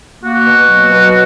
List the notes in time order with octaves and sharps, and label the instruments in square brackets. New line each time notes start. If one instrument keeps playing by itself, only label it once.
[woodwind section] A#3 F#4
B2
F#3
B2